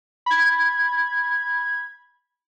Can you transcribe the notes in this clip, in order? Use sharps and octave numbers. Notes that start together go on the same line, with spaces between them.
B5 G#6